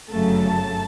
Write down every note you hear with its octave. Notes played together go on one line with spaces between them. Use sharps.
G1 F#2 C#3 F#3 A3 A5